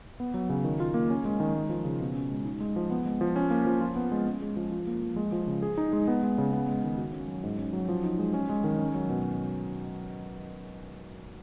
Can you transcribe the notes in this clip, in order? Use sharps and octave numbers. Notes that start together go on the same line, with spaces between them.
B3
F#3
C#3
D#3
F4
A#3
C#4
G#3
D#3
G#3
F3
C#3
B2
C#4
G#3
D#4
G#3
F3
B3
G#3
F3
C#4
A#3
F3
F4
B3
G#3
C#4
G#3
F3
F4
A#3
F3
G#3
F3
C#3
G#4
D#4
G#3
B3
G#3
C#3
B3
G#3
D#3
F#4
C#4
F#3
G#2
C#4
F#3
F3
D#4
G#3
C#4
G#3
D#3
C#4
F#3
B2